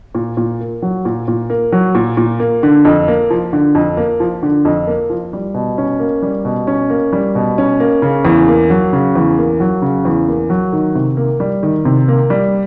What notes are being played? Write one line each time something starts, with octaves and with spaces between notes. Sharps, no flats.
A#2
A#2
A#3
F#3
A#2
A#2
A#3
F#3
A#2
A#2
A#3
D3
F2
A#3
F3
D3
F2
A#3
F3
D3
F2
A#3
F3
G3
B2
C#4
A#3
G3
B2
C#4
A#3
G3
B2
C#4
A#3
C#3
E2
A#3
F#3
C#3
E2
A#3
F#3
C#3
E2
A#3
F#3
D#3
C3
A#3
G3
D#3
C3
A#3
G3